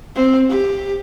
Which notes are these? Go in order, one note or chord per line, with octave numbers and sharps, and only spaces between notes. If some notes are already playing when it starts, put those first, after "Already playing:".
C4
G4